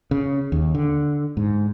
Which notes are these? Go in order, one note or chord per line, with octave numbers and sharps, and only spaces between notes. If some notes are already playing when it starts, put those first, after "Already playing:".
C#3
D#2
D3
G#2